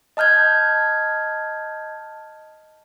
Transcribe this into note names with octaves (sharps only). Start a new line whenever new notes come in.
D#5 A5 F6 G6 G#6